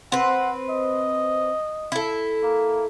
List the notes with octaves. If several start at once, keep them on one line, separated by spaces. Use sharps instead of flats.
C4 B4 F#5
D#5
E4 A4
A#3